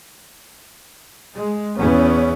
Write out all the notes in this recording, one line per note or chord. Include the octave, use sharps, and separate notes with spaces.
G#3
E2 B3 C#4